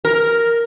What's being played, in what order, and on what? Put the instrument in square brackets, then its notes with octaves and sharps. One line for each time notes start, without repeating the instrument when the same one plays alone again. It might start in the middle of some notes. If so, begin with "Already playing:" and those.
[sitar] A#4